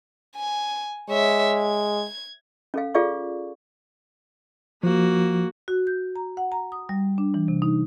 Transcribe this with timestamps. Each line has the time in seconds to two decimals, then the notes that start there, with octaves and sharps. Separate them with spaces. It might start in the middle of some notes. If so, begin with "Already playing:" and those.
0.36 G#5
1.09 G#3 C#5 E5
1.58 G#6
2.74 C#4 A4 F5
2.94 F4 G#4 A4 D5 F5 C#6
4.84 F3 A#3 F#4
5.68 F#4
5.87 G6
6.16 A#5
6.37 F#5
6.52 A#5
6.72 D#6
6.89 G3
7.18 D4
7.34 E3
7.48 C3
7.62 D#4